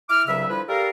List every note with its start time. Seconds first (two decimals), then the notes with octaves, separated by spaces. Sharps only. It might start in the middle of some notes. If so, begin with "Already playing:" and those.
0.10 E4 D6 F6
0.27 C2 G2 C#3 F#3 B4 E5
0.49 D3 F3 G3 E4 B4
0.68 G3 A4 A#4 F5